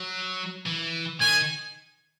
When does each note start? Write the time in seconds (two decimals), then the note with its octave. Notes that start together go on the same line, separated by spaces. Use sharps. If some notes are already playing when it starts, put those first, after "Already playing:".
Already playing: F#3
0.66 E3
1.20 D#3 G#5